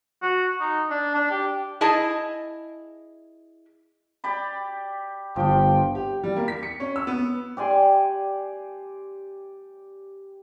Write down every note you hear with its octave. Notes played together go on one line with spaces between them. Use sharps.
F#4
D#4
D4
D4
G4
E4 G#4 D#5 A5
G4 D5 B5
G1 F3 G5 D6
G4
G3
A#3
B6
C#7
C#4
E6
B3
G4 D5 G#5 C6